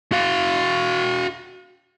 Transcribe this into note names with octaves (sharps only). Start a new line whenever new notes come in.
F#4 F5